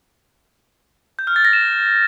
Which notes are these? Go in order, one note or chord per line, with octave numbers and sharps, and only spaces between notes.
G6
F6
A6
A#6
E7